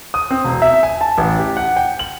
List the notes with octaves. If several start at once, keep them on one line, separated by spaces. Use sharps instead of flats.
D#6
C4
E1
E5
G#5
A5
A1
G4
F#5
G5
F#7